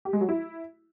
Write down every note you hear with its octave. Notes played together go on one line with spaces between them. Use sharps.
G4
G#3
F#3
E4